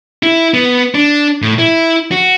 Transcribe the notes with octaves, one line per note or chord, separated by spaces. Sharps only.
E4
B3
D4
A2
E4
F#4